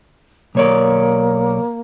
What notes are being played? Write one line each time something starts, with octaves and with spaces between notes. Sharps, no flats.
B1 A#3 C#5 D5